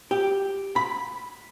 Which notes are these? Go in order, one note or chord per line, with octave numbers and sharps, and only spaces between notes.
G4
B5